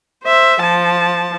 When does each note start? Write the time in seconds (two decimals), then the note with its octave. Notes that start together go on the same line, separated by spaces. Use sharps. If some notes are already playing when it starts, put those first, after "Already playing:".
0.23 C5 E5
0.61 F3 A5